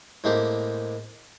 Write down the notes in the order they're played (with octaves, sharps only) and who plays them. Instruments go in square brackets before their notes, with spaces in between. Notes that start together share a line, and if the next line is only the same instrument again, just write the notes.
[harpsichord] A2 G#3 A#3 C4 G4